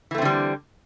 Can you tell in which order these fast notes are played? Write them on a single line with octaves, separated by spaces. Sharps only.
E3 A3 C4 D3 G3